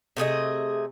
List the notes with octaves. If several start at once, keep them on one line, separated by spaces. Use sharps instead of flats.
C3 A3 G#4 D#5